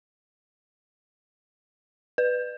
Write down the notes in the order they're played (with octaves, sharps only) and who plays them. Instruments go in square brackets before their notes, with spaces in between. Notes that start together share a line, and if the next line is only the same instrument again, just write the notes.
[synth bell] B4